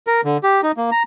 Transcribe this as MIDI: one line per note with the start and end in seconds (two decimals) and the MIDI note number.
0.07 0.21 70
0.25 0.37 50
0.43 0.61 67
0.63 0.72 63
0.77 0.90 58
0.91 1.03 82